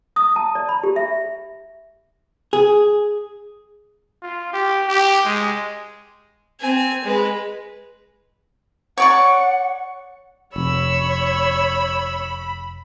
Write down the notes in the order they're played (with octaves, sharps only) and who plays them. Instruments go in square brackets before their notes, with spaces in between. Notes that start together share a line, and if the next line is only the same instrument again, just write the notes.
[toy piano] D#6
A5
D5
B5
G4
E5
[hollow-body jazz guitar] G#4
[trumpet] F4
G4
G4
G#3
[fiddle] C4 G#5
G#3 B4
[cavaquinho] C#5 D5 C#6 [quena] F#5
[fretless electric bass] F1 [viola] C#5 [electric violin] B5 [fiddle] E6